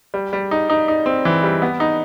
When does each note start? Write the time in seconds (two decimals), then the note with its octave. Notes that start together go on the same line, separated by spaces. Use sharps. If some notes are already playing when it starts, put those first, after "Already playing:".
0.14 G3
0.33 G3
0.51 D#4
0.70 D#4
0.88 D#4
1.06 C4
1.25 E3
1.43 G3
1.62 B3
1.80 D#4